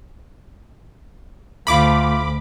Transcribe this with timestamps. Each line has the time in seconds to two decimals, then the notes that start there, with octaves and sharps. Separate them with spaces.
1.67 D2 A3 F4 B5 D6